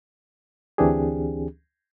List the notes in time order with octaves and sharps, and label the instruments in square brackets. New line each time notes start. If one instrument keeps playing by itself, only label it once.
[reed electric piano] D2 E3 C4 D4 G4 G#4